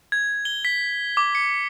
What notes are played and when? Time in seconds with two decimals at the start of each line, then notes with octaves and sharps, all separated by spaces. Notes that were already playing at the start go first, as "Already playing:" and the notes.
0.12 G#6
0.45 G7
0.65 B6
1.17 D6
1.35 C#7